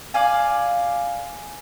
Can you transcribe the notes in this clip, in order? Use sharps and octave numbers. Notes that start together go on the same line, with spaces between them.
D5 F5 G#5